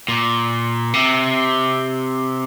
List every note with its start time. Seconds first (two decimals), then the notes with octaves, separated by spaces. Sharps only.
0.08 A#2
0.94 C3